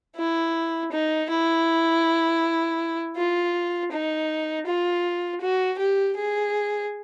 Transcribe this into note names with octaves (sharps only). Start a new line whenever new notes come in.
E4
D#4
E4
F4
D#4
F4
F#4
G4
G#4